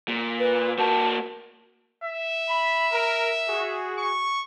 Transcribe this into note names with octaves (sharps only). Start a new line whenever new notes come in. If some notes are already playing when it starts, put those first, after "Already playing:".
A#2
B4
A#3 F#4 A5
E5
B5
A#4
F#4 G#4
C#6